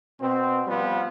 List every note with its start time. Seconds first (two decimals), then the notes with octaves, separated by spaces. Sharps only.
0.19 B2 C4
0.67 F3 G3 B3 F4 B4